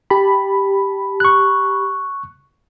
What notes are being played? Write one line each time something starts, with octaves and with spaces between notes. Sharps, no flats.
G4 A5 B5
C#6 F#6